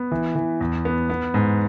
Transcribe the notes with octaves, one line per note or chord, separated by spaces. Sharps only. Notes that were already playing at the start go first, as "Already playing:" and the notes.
Already playing: B3
E3
E3
E2
B3
B3
G#2